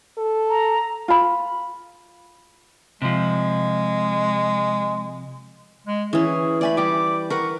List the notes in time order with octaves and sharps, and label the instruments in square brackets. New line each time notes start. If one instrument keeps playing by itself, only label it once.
[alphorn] A4
[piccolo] A#5
[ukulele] F4 B5
[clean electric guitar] C3 F3 [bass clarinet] G#3
[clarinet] G#3
[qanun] E3 C#4 [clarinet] G#4
[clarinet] A3 [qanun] D5 G#5 B5
[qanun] G3 G4 [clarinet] D6
[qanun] A#4 B4 F#5 [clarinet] C#6